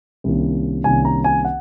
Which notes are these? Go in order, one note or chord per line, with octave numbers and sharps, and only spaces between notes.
C2 C3 D#3 A#3 C#4
C2 C3 D#3 A#3 C#4 G#5
A#5
G#5
F#5